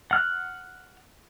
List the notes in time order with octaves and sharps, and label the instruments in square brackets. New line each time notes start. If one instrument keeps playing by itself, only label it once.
[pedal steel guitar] F#5 F6 F#6